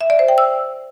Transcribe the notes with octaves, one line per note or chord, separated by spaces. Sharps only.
E5
D5
C5
G5
E6